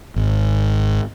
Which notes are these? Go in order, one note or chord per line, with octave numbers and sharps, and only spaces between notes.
G#1